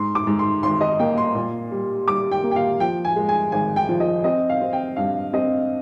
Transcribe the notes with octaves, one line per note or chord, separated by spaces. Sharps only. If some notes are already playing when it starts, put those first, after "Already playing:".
Already playing: G#2 C6
D6
G#2
C6
G#1 C6
D#5
A#3 G5
C6
A#2
G3
G3 D6
G5
A#3
G5
F5
F3 G5
G#5
G#3
G#5
G#1 G#5
G5
F3
D#5
C4 D#5
F5
C4
G5
G2 F5
C4 D#5